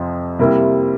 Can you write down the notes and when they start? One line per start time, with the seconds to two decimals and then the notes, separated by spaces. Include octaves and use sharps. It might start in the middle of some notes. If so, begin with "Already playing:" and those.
Already playing: F2 C3 F3
0.39 C3 G3 A#3 E4